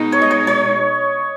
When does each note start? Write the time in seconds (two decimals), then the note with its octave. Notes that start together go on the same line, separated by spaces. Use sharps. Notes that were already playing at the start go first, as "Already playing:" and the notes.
Already playing: B2 G#3 D#4
0.12 C#5
0.22 D#5
0.31 C#5
0.47 C#5